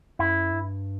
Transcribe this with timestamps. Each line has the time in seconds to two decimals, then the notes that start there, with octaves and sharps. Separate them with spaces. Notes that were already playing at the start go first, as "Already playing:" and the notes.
0.19 F#2 E4
0.52 G2